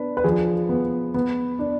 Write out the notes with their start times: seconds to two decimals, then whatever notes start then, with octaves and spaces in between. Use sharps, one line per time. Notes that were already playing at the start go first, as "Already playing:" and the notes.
Already playing: B3 D4 B4
0.17 B4
0.24 F3 G#4
0.69 B3
1.14 B3
1.59 D4